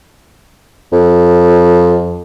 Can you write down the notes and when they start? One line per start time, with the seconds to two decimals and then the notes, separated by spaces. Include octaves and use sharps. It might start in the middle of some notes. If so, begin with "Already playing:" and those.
0.93 F2